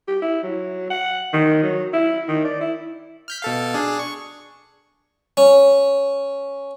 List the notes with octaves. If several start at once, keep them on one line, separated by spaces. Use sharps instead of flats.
G4
E4
F#3
F#5
D#3
F#3
E4
D#3
D5
E4
F6 G6 B6
B2 A4 F5
D4 G#4
C#6
C#4